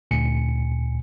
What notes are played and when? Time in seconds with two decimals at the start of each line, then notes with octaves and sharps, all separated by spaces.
0.11 D2 A#2 G#5 C#7